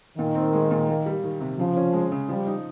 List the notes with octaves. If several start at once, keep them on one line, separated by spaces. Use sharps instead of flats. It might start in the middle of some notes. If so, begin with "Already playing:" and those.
A#2 D#3
C4
G#3
A#2
A#3
G3
D#3
C3
C#3 F3
C#4
G#3
C#3
F3 G3
D#4